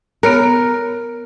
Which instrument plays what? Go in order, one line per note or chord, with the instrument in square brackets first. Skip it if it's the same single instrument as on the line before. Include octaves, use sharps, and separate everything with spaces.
[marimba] B3 C#5 F#6 [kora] A#4